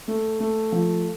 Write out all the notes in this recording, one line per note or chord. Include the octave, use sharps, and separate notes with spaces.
A3
A3
F3